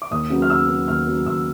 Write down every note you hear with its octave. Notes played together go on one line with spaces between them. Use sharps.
D6
D#2 D#6
C#3 F#3 B3
F6
D#2 E6
C#3 F#3 B3
D#2 F6
C#3 F#3 B3
D#2 E6